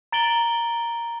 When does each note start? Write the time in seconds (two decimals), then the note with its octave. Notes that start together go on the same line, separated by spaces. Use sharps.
0.12 A#5 A6 D7 F#7 G7